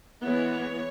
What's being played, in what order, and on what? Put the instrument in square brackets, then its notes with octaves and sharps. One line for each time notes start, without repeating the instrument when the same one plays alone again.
[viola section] E3 G#3 B3 E4 C#5